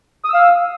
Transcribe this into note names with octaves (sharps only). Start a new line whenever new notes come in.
F5 D#6 E6